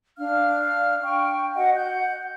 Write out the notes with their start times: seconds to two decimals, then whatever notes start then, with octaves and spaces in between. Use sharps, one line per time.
0.18 D4 F5 F6
1.04 G5 C#6
1.55 F#4 D#5 F#5
1.76 F#5 G6